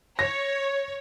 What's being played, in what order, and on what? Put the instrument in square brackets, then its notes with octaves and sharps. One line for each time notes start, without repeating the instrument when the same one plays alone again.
[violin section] C#5 [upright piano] A#6